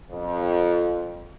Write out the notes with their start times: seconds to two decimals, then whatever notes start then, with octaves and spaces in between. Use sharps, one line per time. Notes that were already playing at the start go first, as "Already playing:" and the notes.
0.11 F2